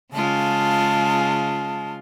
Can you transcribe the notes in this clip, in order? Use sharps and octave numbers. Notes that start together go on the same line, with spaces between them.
C#3 G#3 F4 A5